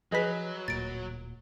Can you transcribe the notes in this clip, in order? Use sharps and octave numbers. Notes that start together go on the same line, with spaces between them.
F3 F#3 G#4 B4 D#5 B6
D1 A#2 A6 D7